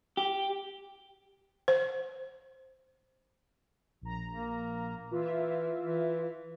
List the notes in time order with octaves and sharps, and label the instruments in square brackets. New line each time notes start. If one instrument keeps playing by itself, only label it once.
[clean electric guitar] G4
[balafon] C5
[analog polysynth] A#1 A#5
[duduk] A#3
[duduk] E3 [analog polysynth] F4 E5
[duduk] E3